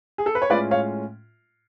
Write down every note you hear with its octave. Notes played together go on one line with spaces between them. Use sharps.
G#4
A4
B4
C#5
A2 G#3 C#4 F4 B4 D5
C#5 F5